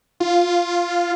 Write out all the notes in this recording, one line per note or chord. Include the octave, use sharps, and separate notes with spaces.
F4